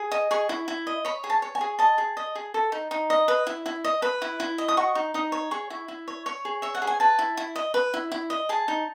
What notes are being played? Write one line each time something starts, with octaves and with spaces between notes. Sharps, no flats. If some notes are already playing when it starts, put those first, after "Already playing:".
Already playing: G#4
D#5
G#4 C#6
E4
E4
D#5
C#5 B5
G#4
A5
C#5
G#5
G#4
D#5 A5
G#4
D#5
G#4
A4
D#4
D#4
D#5
B4
E4
E4
D#5
B4 B5
E4
E4
D#5
D#6
F#4 C#6
D#4
D#4 D#6
C#5
G#4 C#6
E4
E4
C#5
C#5 C#6
G#4
C#5 E5
F#5
G#4
G#5
B4 A5
E4
E4
D#5
B4
E4
E4
D#5
G#4 A5
D#4